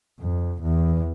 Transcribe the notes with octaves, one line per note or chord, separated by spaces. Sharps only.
F2
E2